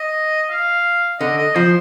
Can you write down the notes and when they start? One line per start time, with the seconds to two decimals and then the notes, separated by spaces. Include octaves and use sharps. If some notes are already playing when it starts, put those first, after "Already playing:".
Already playing: D#5
0.50 F5
1.20 D3 D#5
1.38 D#5
1.55 F3 C5